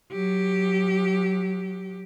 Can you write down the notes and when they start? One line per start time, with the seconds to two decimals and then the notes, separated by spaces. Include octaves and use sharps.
0.12 F#3 G4